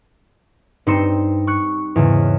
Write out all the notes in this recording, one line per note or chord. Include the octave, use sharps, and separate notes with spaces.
G2 C4 D#4 C6 C#7 E7
C#6 F#6 C#7
E2 G#2 C#3